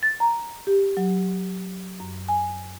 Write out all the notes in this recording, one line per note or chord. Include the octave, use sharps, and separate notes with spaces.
A6
A#5
G4
F#3
F#2
G#5